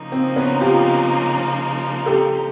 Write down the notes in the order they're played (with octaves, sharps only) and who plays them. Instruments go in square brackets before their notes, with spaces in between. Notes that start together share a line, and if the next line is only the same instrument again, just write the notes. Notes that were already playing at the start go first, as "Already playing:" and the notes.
Already playing: [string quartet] C#3 F3 A#3 D#4
[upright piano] C4
B3 C#4
F4 G4
G4 A4